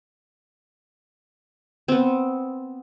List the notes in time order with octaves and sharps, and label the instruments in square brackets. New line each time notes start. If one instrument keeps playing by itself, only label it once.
[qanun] B3 C4